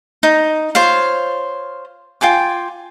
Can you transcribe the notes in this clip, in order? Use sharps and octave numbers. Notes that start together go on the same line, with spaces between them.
D#4
F4 C5 C#5 F5
F4 G5 G#5 D6